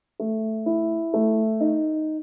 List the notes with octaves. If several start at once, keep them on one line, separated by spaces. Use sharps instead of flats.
A3
E4
A3
D#4